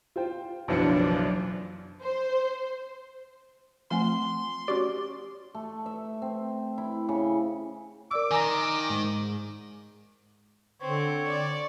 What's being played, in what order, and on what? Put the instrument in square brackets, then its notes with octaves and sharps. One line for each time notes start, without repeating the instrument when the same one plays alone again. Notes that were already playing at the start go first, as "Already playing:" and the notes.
[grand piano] F4 C5 G5
[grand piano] F#1 C#7 [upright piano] B1 [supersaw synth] E3 F3 D4
[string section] C5
[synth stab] F3 [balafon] A3 C4 G#5 [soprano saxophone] C6
[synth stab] C#4 F#4 D5 [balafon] G4
[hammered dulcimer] A3
E5
C4
E4
C#3
[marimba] A#4 D5 E6 [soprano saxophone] D6
[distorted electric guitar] D#3 [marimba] G#5 A#5 A#6
[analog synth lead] G#2
[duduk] D3 [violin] C4 [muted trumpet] C#5
[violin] D5